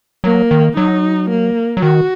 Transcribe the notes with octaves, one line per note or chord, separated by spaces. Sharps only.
F#3 A#3
D#3
F#3 D#4
A#3
F#3
D#3 F#4